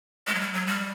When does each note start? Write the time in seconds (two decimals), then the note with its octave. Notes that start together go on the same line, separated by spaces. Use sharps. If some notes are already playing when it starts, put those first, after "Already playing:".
0.27 G#3
0.35 F#3
0.40 G3
0.54 F#3
0.67 G3